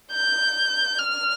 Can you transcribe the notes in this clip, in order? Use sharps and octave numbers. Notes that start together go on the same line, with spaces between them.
G6
F6